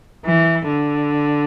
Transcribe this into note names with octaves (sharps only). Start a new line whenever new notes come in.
E3
D3